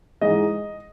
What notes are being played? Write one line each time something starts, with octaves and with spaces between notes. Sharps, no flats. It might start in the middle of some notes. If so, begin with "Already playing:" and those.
G#2 E3 G#3 D#5